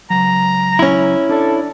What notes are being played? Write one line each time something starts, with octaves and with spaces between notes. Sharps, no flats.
C#2 F#3 A#5
C#4 E4
D4 A4 D5